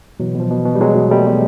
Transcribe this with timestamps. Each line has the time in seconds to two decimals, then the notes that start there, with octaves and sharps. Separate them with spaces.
0.20 B2 E3 F#3
0.35 B2 F3
0.51 B2
0.65 B2
0.75 G3
0.80 B2 F#3 G#3
0.95 B2
1.11 B2 G3 A3
1.26 B2